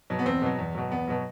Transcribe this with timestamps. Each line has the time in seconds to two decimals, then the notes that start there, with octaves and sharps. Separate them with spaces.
0.10 B2 F#3
0.19 B3
0.25 E2 C4
0.42 B2 F#3
0.59 E2
0.75 B2 F#3
0.91 E2 B3
1.08 B2 F#3